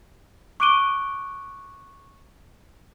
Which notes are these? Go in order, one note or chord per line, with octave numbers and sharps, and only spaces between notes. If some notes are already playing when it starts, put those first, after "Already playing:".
C#6 D6 F#6 D7 D#7 G7